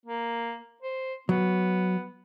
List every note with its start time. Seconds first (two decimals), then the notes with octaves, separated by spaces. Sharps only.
0.06 A#3
0.83 C5
1.29 F#3 B3